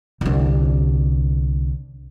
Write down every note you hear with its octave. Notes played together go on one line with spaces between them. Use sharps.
C2 D3